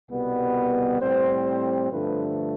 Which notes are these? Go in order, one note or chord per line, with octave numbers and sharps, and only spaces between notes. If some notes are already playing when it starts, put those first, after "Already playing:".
C2 B2 G3 B3
A2 G3 C4 C5
C5
G2 D3 F3 A3 B4